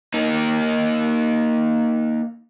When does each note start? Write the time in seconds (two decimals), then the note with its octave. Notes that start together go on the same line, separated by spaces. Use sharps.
0.14 A#3 D#4